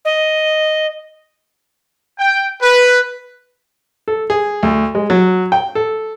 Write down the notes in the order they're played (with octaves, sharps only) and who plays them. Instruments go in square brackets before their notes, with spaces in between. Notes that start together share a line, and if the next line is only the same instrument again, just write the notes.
[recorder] D#5
[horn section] G5
B4
[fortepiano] A4
G#4
D2
G#3
F#3
G5
A4